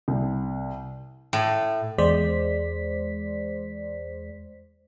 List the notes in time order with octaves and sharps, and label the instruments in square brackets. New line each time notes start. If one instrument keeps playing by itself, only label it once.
[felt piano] C2
[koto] A2
[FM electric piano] E2 G#3 C5 D5 B6